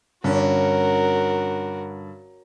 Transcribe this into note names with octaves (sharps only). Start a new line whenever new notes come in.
G2 D3 C#4 F#4 A#4